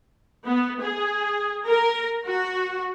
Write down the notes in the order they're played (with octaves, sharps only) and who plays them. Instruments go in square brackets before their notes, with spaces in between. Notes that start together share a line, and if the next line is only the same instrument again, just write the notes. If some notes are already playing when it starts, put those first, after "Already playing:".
[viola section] B3
G#4
A#4
F#4